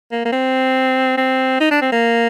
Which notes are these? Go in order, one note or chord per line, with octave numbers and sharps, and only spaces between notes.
A#3
A#3
C4
C4
D#4
D4
C4
A#3